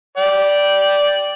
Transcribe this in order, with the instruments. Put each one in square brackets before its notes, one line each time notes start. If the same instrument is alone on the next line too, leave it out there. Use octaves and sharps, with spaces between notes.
[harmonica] D5 G5